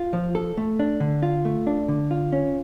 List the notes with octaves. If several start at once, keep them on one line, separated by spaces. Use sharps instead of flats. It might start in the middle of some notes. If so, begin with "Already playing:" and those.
Already playing: F4
F3
A4
A3
D4
D3
F4
A3
D4
D3
F4
C#4